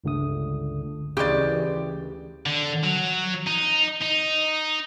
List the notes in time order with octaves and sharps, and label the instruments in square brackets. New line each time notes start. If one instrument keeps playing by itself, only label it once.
[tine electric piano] G1 C#2 D3 A3 D#6
[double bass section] D2 E3 [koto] C#3 G#3 [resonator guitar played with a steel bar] G4 D5
[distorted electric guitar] D3
F#3
D#4
D#4